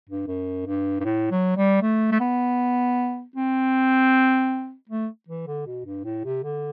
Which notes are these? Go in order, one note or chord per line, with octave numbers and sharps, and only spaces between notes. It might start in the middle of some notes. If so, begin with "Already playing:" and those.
G2
F#2
G2
G2
A2
F#3
G3
A3
A3
B3
C4
A3
E3
D3
B2
G2
A2
C3
D3